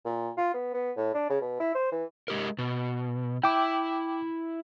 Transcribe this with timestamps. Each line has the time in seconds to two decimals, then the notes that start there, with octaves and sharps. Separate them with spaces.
0.05 A#2
0.37 F4
0.54 B3
0.73 B3
0.97 A2
1.14 D4
1.29 C#3
1.41 B2
1.60 E4
1.75 C5
1.91 E3
2.28 G#3 G4 A#4
2.58 B2
3.44 E4 G5 D6